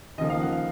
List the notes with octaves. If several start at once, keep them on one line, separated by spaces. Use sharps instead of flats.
D#2 C#3 F3 A#3 D#5
F5
F#5
F5